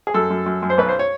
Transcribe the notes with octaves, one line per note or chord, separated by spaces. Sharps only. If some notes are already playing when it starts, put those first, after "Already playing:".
G#4
F#2 A4
F#2
F#2
F#2
C5
B1 B4
C5
C#5